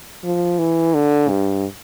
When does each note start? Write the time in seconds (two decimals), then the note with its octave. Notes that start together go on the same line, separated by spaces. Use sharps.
0.24 F3
0.59 E3
0.94 D3
1.29 G2